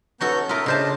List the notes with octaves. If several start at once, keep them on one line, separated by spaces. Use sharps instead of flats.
B3 C#4 F#4 A4 A#5 G6
F4 A#4 E5 D#6
C#3 D4 C5 D#5 A5